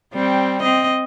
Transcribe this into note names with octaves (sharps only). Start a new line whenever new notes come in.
G3 C4
C4 D#5